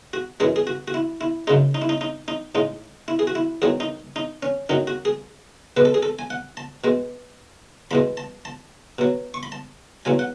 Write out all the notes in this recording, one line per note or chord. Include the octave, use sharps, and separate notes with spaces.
F#4
F#2 E3 G#3 G#4
G#4
F#4
F#4
E4
E4
F#2 C#3 G#3 D#4
D#4
E4
D#4
D#4
D#4
A2 G#3 D#4
E4
G#4
F#4
E4
E2 D#3 F#3 G#4
D#4
D#4
C#4
F#2 D#3 F#3 D#4
F#4
G#4
B2 G#3 B4
A4
G#4
A4
G#5
F#5
A5
B2 G#3
E2 B2 G#3 B5
A5
A5
B2 F#3
C#6
B5
A5
E2 B2 F#3 G#5
F#5